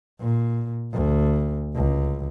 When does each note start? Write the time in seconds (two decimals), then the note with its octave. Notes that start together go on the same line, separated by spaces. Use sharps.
0.21 A#2
0.93 D2
1.75 C#2